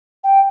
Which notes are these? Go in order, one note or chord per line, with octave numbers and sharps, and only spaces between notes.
G5